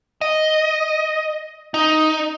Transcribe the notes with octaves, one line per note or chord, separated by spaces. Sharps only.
D#5
D#4